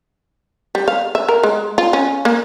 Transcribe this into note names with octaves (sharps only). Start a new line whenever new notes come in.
G3
F5
E5
A#4
G#3
F4
C#4
A#3